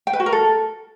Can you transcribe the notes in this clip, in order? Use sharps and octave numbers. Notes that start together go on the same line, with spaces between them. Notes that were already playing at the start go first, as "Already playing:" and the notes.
G5
B4
F#4
A#4
A4